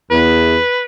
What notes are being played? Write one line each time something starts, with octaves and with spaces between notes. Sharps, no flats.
E2 B4